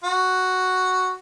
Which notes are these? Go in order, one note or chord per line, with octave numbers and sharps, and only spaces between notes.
F#4